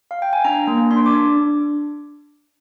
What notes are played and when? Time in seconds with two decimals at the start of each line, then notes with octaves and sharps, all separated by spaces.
0.11 F5
0.22 G5
0.33 G#5
0.44 D4 A#5
0.67 A#3
0.91 D4 C6
1.06 D6
1.13 D4
1.36 D4